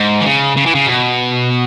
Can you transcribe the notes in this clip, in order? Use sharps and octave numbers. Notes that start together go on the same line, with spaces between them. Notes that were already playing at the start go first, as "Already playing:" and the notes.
Already playing: G#2
E3
C#3
C#3
E3
C#3
B2